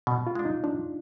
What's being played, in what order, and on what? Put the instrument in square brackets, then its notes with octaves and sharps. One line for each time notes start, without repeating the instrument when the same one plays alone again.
[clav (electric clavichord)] B2
[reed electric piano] F4
[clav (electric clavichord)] G#3 D4
[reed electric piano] D#4
[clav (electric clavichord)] F3 [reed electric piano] D4